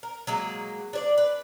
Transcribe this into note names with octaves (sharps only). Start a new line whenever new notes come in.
A#4
F#3 G#3 A#3
D4 C#5 D5
B4